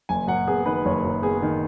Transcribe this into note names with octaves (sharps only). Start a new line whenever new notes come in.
F#1 G#5
F#2 F#5
B3 G#4
D#3 B4
F#1 C#5
F#2
B3 G#4
D#3